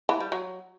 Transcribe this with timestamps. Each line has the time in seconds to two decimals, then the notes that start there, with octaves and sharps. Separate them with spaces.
0.09 E3
0.20 G3
0.32 F#3